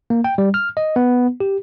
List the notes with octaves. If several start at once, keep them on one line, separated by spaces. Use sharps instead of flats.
A#3
G5
G3
F6
D#5
B3
G4